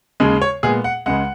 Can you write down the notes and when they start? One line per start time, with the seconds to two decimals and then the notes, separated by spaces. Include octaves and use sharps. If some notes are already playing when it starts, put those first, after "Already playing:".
0.20 D#2 C#3 G#3
0.42 C#5
0.63 A#2 G#3 B3 G#4
0.84 F#5
1.06 C#2 C#3 G#3 F#5